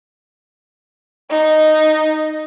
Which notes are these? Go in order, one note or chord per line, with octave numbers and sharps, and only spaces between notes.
D#4